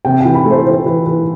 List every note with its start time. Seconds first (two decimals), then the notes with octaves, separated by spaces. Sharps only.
0.05 C3 G5
0.21 E3 G5
0.35 B5
0.45 A3
0.51 C5
0.66 E3 C5
0.86 E3 B4
1.06 E3 B4